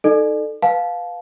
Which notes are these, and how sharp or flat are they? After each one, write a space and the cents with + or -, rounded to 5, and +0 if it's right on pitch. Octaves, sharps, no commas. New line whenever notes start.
D#4 +0 A4 +0 D5 +35
B4 +0 F5 +15 A5 -25